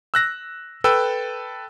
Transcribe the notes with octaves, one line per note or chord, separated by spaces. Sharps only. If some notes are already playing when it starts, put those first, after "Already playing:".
E6 F#6 A#6
A4 B4 G5 E6